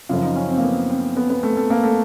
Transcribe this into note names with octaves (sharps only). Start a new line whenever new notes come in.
F#2 C#3 F3 F4
D#4
C#4
C4
A#3
B3
C4
B3
B3
A3
A3
A#3
A3